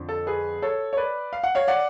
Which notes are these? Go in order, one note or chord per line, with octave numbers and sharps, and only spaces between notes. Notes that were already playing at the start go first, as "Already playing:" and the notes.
Already playing: F2 D3 F3
A4
G#4 B4
A4 C#5
C#5
B4 D5
F5
F#5
C#5 F5
D5 F#5